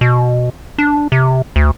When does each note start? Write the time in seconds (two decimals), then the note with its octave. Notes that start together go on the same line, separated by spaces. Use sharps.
0.01 B2
0.78 D4
1.12 C3
1.56 D2